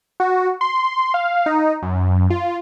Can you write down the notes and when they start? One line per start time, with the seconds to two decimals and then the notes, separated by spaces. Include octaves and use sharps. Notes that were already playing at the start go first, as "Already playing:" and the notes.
0.20 F#4
0.61 C6
1.14 F5
1.46 D#4
1.82 F#2
2.30 F4